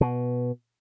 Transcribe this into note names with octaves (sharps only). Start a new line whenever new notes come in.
B2